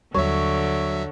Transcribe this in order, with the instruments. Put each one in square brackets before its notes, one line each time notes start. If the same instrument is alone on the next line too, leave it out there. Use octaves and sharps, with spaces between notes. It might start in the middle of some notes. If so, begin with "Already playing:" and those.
[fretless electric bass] D#2 G3 [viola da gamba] D3 [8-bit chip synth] F#3 E5 [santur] C#5